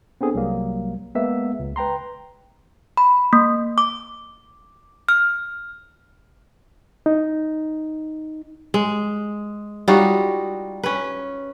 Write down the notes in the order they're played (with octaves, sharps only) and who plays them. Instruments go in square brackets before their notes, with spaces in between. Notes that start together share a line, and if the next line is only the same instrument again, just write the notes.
[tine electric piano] B3 C4 D4 G#4 A4
C2 F#3 G3 A#3
G#3 A#3 B3 B4 E5
C#2
B4 G5 A#5 C6
[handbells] B5
A#3
D6
F6
[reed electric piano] D#4
[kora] G#3
G3 D#4 F4 F#4
C#4 B4